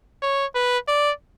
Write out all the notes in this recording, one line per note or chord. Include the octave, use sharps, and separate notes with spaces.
C#5
B4
D5